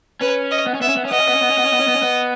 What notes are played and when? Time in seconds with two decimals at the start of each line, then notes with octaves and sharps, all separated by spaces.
0.21 C#4 B4
0.51 D#5
0.66 B3
0.74 C#4
0.81 B3 E5
0.89 C#4
0.97 B3
1.05 C#4
1.11 B3 D#5
1.20 C#4
1.28 B3
1.35 C#4
1.42 B3
1.51 C#4
1.58 B3
1.65 C#4
1.73 B3
1.81 C#4
1.88 B3
1.96 C#4
2.03 B3